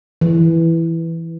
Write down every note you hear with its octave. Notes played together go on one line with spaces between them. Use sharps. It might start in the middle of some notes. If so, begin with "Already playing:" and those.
E3